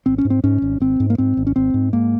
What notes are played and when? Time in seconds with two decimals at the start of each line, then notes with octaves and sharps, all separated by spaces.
0.06 G#1 C4
0.18 C#4
0.25 G#2
0.30 C4
0.44 G#2 C#4
0.62 G#1
0.80 G#1 C4
1.00 G#2
1.10 A#3
1.18 G#2 C4
1.37 G#1
1.47 C#4
1.56 G#1 C4
1.74 G#2
1.93 G#2 A#3